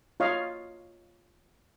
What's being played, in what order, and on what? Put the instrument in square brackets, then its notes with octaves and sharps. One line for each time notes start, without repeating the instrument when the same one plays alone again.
[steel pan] F4 C#5 D#5 F5